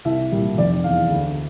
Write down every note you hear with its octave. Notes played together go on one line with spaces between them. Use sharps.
C2 E5
A#2 G3
F1 D5
E2 E3 F5
D2